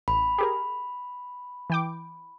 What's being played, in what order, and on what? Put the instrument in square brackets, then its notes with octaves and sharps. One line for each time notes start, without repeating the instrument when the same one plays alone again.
[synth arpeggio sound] A1 [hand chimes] B5
[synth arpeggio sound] G4 G#4 A#4
E3 G5 D6